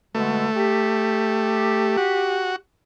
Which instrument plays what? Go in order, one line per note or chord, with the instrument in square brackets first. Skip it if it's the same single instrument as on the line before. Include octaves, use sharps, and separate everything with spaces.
[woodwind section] B2 D3 G#3 [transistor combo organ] A3
[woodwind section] G4
[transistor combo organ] F#4